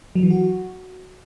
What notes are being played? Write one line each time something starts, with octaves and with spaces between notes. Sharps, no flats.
F#3
E3
F#4